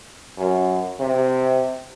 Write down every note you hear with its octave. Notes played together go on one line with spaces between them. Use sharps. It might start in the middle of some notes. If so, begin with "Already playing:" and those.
F#2
C3